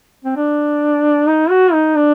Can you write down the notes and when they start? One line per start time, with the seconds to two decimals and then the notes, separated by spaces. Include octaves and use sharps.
0.24 C4
0.37 D4
1.28 D#4
1.50 F#4
1.73 D#4
1.95 D4